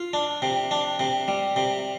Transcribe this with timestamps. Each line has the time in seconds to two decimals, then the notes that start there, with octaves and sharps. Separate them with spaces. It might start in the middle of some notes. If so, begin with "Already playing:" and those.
Already playing: F4
0.13 D4
0.42 C3
0.71 D4
0.99 C3
1.28 G3
1.56 C3